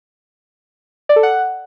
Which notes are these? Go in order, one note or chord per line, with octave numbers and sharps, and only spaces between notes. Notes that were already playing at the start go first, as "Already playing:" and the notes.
D5
A4
F#5